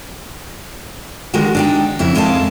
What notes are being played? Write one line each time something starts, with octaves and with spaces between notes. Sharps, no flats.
D3 D#3 G3 G#3 F#4
D4 D#4 G5
F2 C#3 E4 E5
F2 G#3 E4 A#4 F5 A5